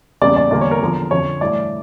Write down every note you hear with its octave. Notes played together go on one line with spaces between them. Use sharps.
E2 C#3 G3 A#3 D5
D5
E2 D3 G3 A#3 D5
C#5
A#4
E2 D3 F3
F2 D3 F3 C#5
G2 E3 A3 D5